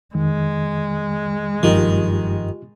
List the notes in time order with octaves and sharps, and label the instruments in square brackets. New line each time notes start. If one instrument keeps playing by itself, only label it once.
[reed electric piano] F2 D#3 [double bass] G#3
[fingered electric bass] F#1 G2 F3 [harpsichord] D#3 [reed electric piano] F4 G4